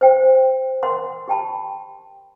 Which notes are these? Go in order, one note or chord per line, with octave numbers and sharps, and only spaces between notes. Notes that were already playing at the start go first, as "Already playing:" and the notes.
C5 G5
A#4 F#5 C6
G4 G5 A5 B5